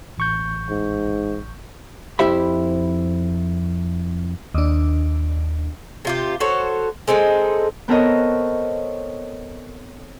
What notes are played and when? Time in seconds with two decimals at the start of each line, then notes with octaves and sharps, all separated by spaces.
0.18 A1 C#6 G6
0.70 G#2
2.19 F2 E4 G4 C5 E5 B5
4.54 D#2 D4
6.05 C3 F4 G4
6.40 F#4 A4 C5 C#5
7.08 G#3 C4 D#4 A4
7.88 B3 C4 A4 A#4 C#5 D#5